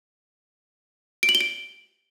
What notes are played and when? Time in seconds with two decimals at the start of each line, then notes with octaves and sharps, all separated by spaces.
1.23 D7
1.29 F#7
1.35 G7
1.41 D7